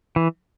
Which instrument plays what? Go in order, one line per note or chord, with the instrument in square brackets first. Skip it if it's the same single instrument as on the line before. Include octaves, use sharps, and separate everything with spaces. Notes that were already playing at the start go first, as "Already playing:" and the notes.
[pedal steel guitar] E3